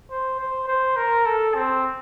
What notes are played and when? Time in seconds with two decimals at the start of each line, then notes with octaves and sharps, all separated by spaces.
0.10 C5
0.39 C5
0.68 C5
0.96 A#4
1.26 A4
1.55 C4